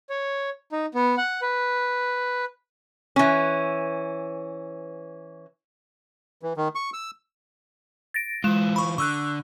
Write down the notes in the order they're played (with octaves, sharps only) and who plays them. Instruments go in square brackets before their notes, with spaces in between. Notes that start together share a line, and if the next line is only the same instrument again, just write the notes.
[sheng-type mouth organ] C#5
D#4
B3
F#5
B4
[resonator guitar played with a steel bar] E3 C#4
[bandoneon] E3
D#3
C#6
E6
[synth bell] A6 A#6 D7
[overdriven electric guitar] E3 F4 [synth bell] G#3 E7
[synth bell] B5 C#6
[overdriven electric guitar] D3 [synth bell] C#6 E6 F#6